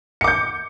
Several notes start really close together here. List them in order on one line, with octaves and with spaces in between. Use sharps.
C#7 D6 G6